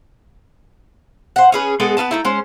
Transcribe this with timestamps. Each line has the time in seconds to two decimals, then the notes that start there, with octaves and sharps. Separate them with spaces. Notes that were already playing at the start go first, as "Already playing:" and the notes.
1.36 C5 F#5
1.52 C#4 G#4 B4
1.80 G#3 B3 G#4 A4
1.97 B3 D4 B4 A5
2.11 A3 D#4 E4
2.25 G#3 C#4 C5